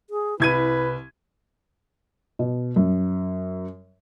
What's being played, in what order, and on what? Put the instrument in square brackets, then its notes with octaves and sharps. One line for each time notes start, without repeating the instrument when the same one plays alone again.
[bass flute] G#4
[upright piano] C2 G#6 D#7 [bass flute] E4 [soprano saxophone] B4
[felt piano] B2
F#2